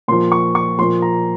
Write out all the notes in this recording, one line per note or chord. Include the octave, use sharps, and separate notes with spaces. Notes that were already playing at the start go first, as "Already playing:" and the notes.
A#2 F3 C6
C#6
C#6
A#2 F3 C6
A#5